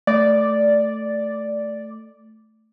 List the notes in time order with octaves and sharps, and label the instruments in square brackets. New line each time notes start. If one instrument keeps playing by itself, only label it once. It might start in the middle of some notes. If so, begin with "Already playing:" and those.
[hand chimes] A3 [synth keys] D5